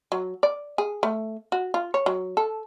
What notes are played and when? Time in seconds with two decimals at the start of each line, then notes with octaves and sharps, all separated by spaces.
0.12 F#3
0.43 D5
0.78 G#4
1.03 A3
1.52 F#4
1.74 F4
1.94 C#5
2.06 F#3
2.37 A4